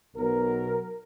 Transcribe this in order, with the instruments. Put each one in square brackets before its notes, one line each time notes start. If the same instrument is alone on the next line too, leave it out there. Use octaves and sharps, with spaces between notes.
[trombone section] B1 B2 F#3 A#4